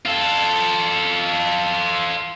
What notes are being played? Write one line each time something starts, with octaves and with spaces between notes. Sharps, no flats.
F4 A4